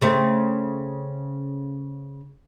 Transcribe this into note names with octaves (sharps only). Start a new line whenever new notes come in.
C#3 A3 C4